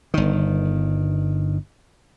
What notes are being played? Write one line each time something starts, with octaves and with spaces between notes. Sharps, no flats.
G1 D#3